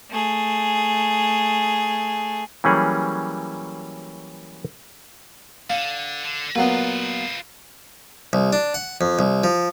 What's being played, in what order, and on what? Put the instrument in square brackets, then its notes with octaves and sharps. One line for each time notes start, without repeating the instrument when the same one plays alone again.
[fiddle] A3 G#4
[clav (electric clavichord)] E3 F#3 G3 A#3 C#4 G#4
[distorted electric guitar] D3 [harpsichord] F5
[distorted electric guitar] D3
[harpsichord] A#2 F#3 B3 [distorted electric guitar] F4 B4
[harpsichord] C2
D4
F#5
F2
C2
F3